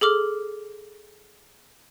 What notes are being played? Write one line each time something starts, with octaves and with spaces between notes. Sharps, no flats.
G#4 A4 D6 F6